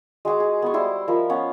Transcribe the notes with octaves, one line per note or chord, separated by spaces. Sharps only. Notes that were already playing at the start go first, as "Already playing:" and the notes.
G#3 F#4 G#4 D6
G#4
B3 C6 C#6
G3 E4 C5 C6
F3 A#4 D#5 B5
B3 C#4 F5 F#5